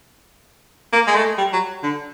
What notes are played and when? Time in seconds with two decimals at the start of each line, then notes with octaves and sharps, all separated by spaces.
0.93 A#3
1.07 G#3
1.15 A3
1.38 G3
1.53 F#3
1.83 D3